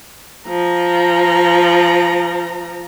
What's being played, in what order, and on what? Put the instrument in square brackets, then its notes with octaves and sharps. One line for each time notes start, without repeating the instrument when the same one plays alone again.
[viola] F3 A#5